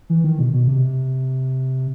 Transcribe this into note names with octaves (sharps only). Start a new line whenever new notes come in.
E3
D#3
B2
B2
C3